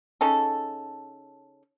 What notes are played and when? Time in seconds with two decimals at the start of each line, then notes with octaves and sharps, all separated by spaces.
0.21 C#3 C#4 D#4 A4